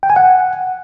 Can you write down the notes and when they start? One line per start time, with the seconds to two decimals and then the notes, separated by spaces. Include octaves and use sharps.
0.03 G5
0.10 G#5
0.16 F#5